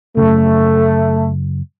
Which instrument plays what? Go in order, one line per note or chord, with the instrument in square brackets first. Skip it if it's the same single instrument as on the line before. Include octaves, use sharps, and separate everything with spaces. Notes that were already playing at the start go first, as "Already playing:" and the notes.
[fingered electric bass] F#2 C#3 [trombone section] A3